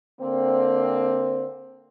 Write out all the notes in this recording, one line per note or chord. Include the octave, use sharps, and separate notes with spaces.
D3 A#3 C4